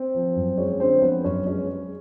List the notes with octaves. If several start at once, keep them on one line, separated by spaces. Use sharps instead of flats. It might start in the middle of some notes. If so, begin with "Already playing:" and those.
Already playing: C4 C5
F3
F#2
G#3 C#4 C#5
D3 C4 C5
F3 B3 B4
F#2 C#4 C#5
G#3 C#4 C#5
G#3